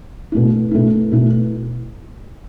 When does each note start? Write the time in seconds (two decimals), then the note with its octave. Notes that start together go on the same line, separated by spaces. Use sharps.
0.32 B2 A3 E4
0.71 B2 A3 E4
1.12 B2 A3 E4